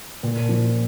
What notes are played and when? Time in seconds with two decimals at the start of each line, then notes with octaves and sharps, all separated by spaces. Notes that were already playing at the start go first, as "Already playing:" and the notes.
0.23 A#2
0.49 F3